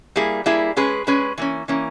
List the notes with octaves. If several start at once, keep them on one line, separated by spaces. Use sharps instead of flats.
G3 A#3 E4 G#4
G3 A#3 E4 G#4
G#3 C#4 G#4 B4
G#3 C#4 G#4 B4
E3 A#3 C#4
E3 A#3 C#4